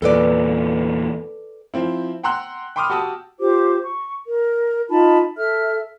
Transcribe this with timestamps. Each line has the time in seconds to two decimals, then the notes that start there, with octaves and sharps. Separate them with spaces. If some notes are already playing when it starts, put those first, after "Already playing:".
0.02 E2 A#2 A4 B4 D5
1.74 F3 C4 E4
2.23 F#5 G5 A#5 C6 E6 F#6
2.76 G5 B5 C6 D6 D#6 F6
2.90 F#4 G4 A5 D#6 E6
3.40 F4 G4 C5 D6
3.82 C#6
4.27 A#4
4.90 D#4 F4 A5 B5
5.37 A4 E5 F6